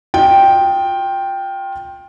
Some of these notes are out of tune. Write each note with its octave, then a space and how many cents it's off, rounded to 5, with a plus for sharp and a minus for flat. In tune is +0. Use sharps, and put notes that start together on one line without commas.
F4 +25 D#5 +0 G5 +0